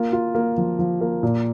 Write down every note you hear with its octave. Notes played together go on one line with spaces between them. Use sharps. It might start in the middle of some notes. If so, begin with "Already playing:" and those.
Already playing: A#3 F4
F4
A#3
F3
F3
A#3
A#2